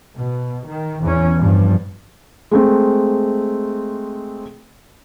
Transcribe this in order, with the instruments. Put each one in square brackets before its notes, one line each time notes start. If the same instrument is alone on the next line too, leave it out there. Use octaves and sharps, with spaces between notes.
[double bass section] B2
D#3
E2 E3 C#4
G2 F3
[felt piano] G#3 A3 C4